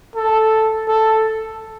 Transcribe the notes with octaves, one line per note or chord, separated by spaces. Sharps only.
A4
A4